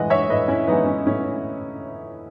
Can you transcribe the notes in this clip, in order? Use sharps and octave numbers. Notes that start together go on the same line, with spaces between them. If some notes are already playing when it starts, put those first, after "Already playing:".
Already playing: A2 E3 G#3 D#5 F#5
C#5 E5
A2 B4 D#5
C#4 E4
E3 G#3 B3 D#4
C#4
A2 C#4